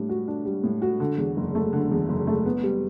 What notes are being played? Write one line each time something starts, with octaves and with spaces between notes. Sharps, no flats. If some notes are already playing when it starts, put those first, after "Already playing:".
Already playing: A2 G3 D4
F#4
D4
G3
A2
F#4
D3
E2
F#1
A3
D3
E2
F#1
A3
B3
G3